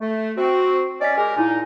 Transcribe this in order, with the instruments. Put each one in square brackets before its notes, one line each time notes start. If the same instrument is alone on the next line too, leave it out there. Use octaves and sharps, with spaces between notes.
[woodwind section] A3
C4 F#4
[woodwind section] C#4 D5 [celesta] D#5 G#5 B6
[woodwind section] G#3 G4 A#4 [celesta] G#5
[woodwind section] A#2 D#4 [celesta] E4 G#5